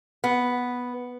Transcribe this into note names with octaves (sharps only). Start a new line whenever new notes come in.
B3